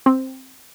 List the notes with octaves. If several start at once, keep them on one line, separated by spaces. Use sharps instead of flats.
C4